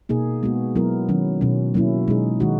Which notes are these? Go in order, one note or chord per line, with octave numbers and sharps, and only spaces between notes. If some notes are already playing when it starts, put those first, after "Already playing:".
B2 A#3 D#4 G#4
G#3 B3 F#4
F#3 B3 E4 A#4
D#3 F#3 C#4
B2 F#3 C#4
F#3 A#3 C#4 E4
B2 G#3 D#4 G#4
D#3 G#3 D#4 F#4